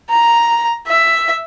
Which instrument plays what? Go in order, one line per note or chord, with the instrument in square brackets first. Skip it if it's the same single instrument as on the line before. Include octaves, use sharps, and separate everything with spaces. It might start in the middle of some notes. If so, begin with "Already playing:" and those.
[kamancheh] A#5
E5